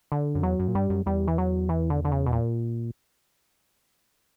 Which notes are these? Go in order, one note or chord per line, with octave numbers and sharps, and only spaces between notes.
D3
F#2
E2 F#3
F#2
A#2
G2 G3
F#2
E2 G3
E3
F#3
E3
D3
D3
C#3
B2
A#2